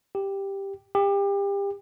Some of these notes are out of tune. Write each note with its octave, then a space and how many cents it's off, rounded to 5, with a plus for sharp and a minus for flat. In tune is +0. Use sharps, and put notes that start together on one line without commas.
G4 +5
G4 +30